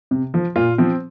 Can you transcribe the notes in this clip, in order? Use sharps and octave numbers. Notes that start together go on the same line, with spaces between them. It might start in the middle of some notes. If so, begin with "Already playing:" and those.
C3
F3
A#2 F4
F3 C4